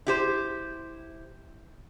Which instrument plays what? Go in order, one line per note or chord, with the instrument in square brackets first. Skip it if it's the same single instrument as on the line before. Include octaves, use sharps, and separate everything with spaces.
[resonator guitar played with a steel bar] E4 G4 C5